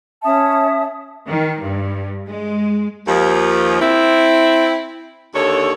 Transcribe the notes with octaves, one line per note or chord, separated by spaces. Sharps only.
C#4 E5 A5 D#6
D#3
G2
G#3
D#2 F3
C4 E4
D#2 D3 A4 C#5